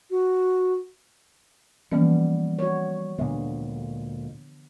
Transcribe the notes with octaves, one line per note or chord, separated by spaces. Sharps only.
F#4
E3 F3 G3 A#3 B3 C#4
F#4 C#5
D2 A#2 D3 G#3 B3